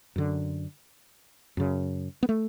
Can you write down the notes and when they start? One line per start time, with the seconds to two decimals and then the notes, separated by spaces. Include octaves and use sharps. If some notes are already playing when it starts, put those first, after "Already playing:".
0.16 F#2 D3
1.57 F#2 C#3
2.23 B3
2.29 A3